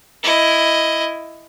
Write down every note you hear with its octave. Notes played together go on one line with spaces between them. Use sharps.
E4 D#5